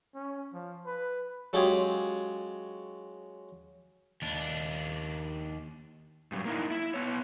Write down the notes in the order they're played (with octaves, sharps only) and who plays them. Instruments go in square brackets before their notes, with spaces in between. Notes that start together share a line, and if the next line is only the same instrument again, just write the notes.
[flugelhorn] C#4
F3
B4
[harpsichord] F#3 G#3 C#4 F4 G4 G#4
[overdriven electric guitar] D#2 D4
[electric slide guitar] G2 D#3 F#3
A#3 D#4 E4
E4
B3 C#5